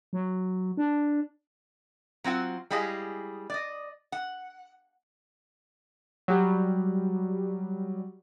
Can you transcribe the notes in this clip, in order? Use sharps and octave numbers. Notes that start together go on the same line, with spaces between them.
F#3
D4
F#3 C4 F4 F#5
G3 G#3 E4 G#4 D#5 F5
D5 D#5
F#5
F#3 G3